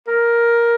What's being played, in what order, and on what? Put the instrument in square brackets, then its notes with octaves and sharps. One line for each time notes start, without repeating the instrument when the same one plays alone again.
[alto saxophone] A#4